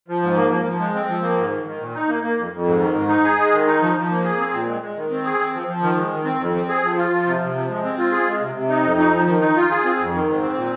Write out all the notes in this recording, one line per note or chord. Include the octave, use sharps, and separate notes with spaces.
F3
G#2
A#3
F3
F3
G#3
C4
F3
A#3
G#2
D#3
D#3
A#2
D#4
A#3
A#3
F2
F2
G#2
D#3
G#2
D#4
G#4
G#3
D#3
D#4
F3
F3
A#3
G#4
C4
A#2
G#3
G#3
D#3
C4
G#4
C4
F3
F3
D#3
G#3
D#3
C4
F2
C4
G#4
F3
F4
F3
C3
C3
F3
G#3
C4
F4
G#4
G#3
C3
C3
D#4
F2
D#4
F3
D#3
D#4
F4
G#4
C4
F2
D#3
G#2
C4
A#2